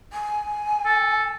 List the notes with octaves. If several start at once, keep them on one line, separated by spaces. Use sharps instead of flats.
G#5
A4